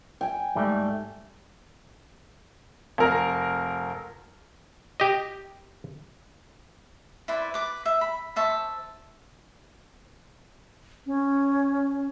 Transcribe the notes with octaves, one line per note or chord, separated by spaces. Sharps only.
G5 G#5
G#2 G3 A3
F1 A#4
G4 D#5
E4 B4 C5 D5
B4 D6
E5
B5
C5 E5 A5 C#6
C#4